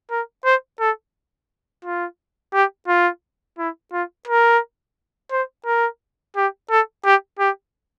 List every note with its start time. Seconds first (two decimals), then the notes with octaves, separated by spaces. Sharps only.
0.11 A#4
0.45 C5
0.80 A4
1.85 F4
2.53 G4
2.88 F4
3.58 E4
3.93 F4
4.28 A#4
5.32 C5
5.66 A#4
6.36 G4
6.70 A4
7.05 G4
7.39 G4